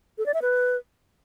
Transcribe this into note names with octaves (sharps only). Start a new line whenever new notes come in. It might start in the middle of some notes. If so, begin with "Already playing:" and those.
A4
D5
E5
B4